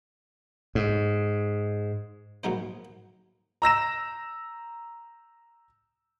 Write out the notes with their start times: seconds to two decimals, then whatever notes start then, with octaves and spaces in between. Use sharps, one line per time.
0.75 G#2
2.44 A#1 A#2 F#3 D#4 C5
3.62 A#5 E6 A#6 E7